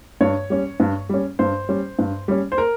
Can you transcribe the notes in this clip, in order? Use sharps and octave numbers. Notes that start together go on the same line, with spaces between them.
G2 C#5
G3 C#4
G2
G3 C#4
G2 C5
G3 C#4
G2
G3 C#4
C5
A#4